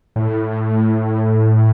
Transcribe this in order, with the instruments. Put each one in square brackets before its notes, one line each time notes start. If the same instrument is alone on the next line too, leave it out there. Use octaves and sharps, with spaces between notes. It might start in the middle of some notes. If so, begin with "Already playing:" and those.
[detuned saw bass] A2